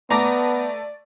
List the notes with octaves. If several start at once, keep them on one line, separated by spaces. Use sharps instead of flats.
A3 B3 D5 A#5 D6 A#6